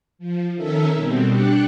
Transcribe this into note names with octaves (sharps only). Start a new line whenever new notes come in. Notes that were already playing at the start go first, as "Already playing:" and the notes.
F3
D#3 C#4 A4 A#4 E5
B2 G3 C4
D4 G4 F#6 C#7